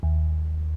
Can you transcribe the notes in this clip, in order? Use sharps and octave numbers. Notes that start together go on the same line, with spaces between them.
D#2